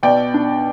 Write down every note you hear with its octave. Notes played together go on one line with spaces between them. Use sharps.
B2 D5 G5
D4